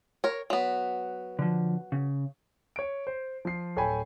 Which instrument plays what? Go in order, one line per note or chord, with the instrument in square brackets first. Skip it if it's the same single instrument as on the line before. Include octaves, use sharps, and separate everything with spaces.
[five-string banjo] A#4 C#5
F#3 B3
[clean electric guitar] D3 F3
C#3
[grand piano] C#5 D7
C5
F3 C7
D1 A4 C#5 G5 G#5 B5